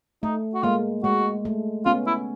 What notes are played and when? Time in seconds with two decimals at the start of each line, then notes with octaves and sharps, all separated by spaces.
0.23 A3 D#4
0.54 F#4
0.63 G#3 A#3 F4
1.04 G#3 F#4
1.45 A3
1.86 B3 C#4 F4
2.07 E4